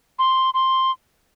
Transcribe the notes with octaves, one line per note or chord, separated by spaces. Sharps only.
C6
C6